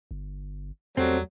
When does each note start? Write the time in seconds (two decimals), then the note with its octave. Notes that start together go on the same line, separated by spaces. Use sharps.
0.11 G1
0.97 E2 F#3 G3 A3 C4